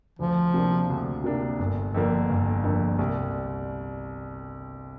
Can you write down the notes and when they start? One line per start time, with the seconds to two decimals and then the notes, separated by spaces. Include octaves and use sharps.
0.18 D2 F3
0.54 C3 A#3 D4
0.90 D2
1.24 C3 A#3 D4
1.59 G1
1.94 F2 D3 A#3 D4
2.30 G1
2.64 F2 D3 A#3 D4
2.99 C2